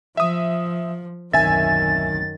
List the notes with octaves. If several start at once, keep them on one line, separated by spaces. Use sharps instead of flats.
F3 E5 D#6
D1 B1 F#2 D#3 C4 E5 G#5 A6